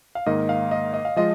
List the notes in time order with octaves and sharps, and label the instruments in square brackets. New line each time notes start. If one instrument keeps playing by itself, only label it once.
[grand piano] F5
[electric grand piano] G#2 D#3 A#3 [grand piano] D#5
[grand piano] F5
D#5
D#5
F5
[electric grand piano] F3 G#3 F4 [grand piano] D#5